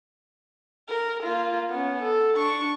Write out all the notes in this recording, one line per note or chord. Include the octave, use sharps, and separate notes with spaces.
A#4
A#3 F4
B3 C#4
A4
D4 C#6